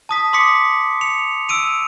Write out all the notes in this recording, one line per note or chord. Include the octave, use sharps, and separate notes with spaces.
A5 D#6 B6
C6 D6 D#6 B6 C#7
C#7 F7
E6 D7 D#7 F7